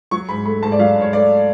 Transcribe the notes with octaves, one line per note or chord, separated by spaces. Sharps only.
F#3 C#6
G#2 B5
A3 B5
G#2 A5
D5
F#3 F5
G#2
C#5
A3 D5